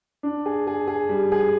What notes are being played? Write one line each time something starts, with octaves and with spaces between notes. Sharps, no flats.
D4
G#4
G#4
G#4
G3
G#4